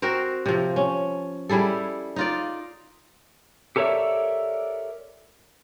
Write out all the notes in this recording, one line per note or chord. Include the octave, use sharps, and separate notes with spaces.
C4 F#4 A#4 C5
C3 F3
C#4
G3 E4 G#4 A4
D#4 F4 D5
G4 A4 A#4 C#5 D5 E5